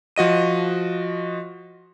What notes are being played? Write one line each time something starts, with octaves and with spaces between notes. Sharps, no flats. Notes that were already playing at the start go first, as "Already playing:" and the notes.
F3 F#4 D#5 D#7